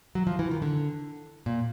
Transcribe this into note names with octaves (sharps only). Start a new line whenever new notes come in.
F#3
F3
E3
D#3
D3
A#2